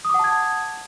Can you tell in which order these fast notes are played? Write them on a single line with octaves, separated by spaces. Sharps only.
D#6 D6 F#5 A5 G#6